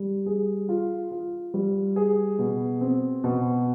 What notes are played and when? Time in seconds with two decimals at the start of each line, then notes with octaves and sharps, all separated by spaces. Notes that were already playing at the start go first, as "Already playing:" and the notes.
Already playing: G3
0.26 G#4
0.69 F4
1.11 F4
1.54 G3
1.96 G#4
2.39 B2
2.81 C4
3.24 B2